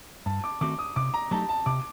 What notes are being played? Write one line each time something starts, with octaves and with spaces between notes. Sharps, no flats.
G2 A5
D6
D#3 A3 C4 F#4 D6
D#6
C3 D6
A#5
F#3 A3 D#4 G4 A5
A5
C3 D6